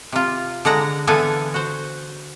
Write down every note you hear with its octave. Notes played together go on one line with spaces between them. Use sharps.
C3 F4
D3 G#3 F#5 A#5
D3 E3 B3 A4 F5 G#5
F#4 C5